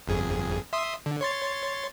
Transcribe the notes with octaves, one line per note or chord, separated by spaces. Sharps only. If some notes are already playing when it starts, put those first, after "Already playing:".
G1 F2 G#4
E5 C6 D#6
D3
C#5 C6 A6